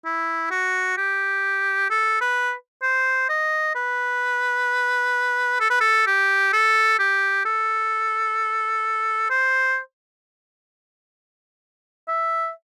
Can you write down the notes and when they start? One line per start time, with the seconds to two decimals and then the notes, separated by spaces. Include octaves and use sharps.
0.05 E4
0.51 F#4
0.98 G4
1.90 A4
2.21 B4
2.82 C5
3.29 D#5
3.75 B4
5.60 A4
5.70 B4
5.81 A4
6.07 G4
6.53 A4
6.99 G4
7.45 A4
9.30 C5
12.08 E5